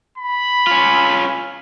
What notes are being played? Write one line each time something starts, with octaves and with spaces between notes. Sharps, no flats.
B5
C#4 F4